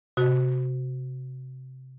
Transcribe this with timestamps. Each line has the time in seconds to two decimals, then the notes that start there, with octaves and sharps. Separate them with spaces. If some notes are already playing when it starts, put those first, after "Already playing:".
0.17 C3 F#4